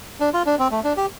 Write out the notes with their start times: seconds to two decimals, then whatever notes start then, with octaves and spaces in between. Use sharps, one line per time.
0.20 D4
0.34 F4
0.46 D4
0.59 C4
0.71 A3
0.84 D4
0.97 G4